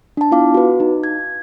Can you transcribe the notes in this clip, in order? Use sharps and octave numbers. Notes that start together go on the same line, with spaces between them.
D4 A5
B3 E4 F4 F5 D6
F#4 B4
D#4
G#6